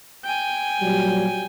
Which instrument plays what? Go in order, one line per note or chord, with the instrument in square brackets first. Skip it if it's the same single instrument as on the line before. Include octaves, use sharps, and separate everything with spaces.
[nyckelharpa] G5 G#5
[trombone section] A#2 F#3 G3